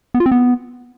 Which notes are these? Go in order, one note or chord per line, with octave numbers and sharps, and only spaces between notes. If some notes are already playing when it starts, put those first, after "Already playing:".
B3
F4
C4
B3